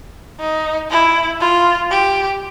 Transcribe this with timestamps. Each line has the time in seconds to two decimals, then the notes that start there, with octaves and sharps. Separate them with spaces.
0.40 D#4
0.90 E4
1.40 F4
1.91 G4